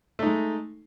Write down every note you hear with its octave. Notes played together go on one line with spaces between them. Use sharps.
G#3 A3 D#4